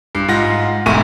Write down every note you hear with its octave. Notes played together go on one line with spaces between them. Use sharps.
G2 C7
G#2 F4 F#5 A#6
E1 E2 G#2 A3 C#6 D#7